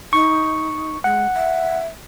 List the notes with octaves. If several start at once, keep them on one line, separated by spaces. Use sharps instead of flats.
D#4 C#6
G#3 F#5
E5